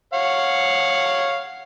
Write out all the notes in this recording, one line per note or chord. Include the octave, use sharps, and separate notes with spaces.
C#5 F5 F#5